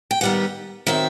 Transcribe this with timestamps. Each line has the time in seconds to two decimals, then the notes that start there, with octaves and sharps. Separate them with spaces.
0.11 G5
0.21 D#3 G3 B3 F#5
0.86 D#3 F#3 C4 E5